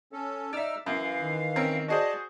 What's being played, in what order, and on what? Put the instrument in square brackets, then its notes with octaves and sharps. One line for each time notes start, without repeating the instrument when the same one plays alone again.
[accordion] C#4 A4
[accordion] D#4 E6 F6 [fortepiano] D5 E5
[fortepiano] F#2 [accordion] E3 F5
[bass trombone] D#3
[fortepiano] C4 C#4 A#4
[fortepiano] F#4 G#4 C5 [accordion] D5 D#5 A5